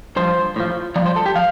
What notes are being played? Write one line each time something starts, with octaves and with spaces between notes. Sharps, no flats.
G2 F3 C5
A2 F3
G2 F3 D5
C5
A4
G4
F3 F5